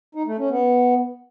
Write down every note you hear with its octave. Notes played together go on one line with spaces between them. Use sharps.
D#4
A3
C#4
B3